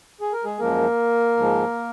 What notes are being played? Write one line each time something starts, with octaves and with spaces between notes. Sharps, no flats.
G#4
A#4
G#3 G#4
F#2 F3 G#3 A#3 A#4
G#2 F3 G#3